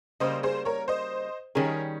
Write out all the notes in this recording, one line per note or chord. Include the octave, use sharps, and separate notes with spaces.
C#3 G3 A#3 C5 D#5
G#4 C5
A#4 C#5
C5 D#5
D#3 G3 C#4 G#4 A#4 C#5